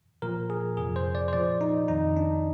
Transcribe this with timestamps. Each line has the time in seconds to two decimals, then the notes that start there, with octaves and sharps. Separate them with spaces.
0.22 A#2 F3 A#4
0.50 G#4
0.77 F2 C3 F3 G#4
0.96 C5
1.15 D5
1.28 C5
1.33 A#2 F3 D5
1.61 D#4
1.88 F2 D#3 D#4
2.17 D4